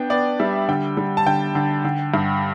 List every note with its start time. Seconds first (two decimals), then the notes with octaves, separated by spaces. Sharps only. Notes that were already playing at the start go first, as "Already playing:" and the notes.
Already playing: B3 D4 G5
0.10 B3 D5
0.39 G3 E5
0.68 D3 G5
0.97 G3
1.17 A5
1.26 D3 G5
1.55 D3
1.85 D3
2.14 G2